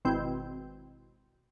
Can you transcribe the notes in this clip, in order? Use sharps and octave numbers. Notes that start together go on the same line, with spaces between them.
G#1 B2 C4 E4 G6